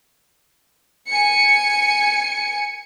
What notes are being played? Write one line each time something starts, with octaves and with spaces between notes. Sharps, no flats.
G#5 C#7